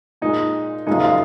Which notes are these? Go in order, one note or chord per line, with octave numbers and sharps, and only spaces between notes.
A#2 G#3 D#4
F#2 C#3 F3 G#3 D#4
F4